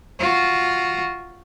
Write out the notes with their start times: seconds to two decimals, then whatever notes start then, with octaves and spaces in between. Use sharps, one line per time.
0.19 F4 F#4